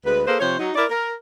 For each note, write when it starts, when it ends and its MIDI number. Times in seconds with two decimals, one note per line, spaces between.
0.05 0.21 38
0.05 0.21 56
0.05 0.21 71
0.26 0.36 58
0.26 0.36 68
0.26 0.36 69
0.26 0.36 71
0.26 0.36 72
0.39 0.55 48
0.39 0.55 53
0.39 0.55 72
0.39 0.55 73
0.58 0.71 54
0.58 0.71 63
0.74 0.84 64
0.74 0.84 70
0.74 0.84 74
0.89 1.12 70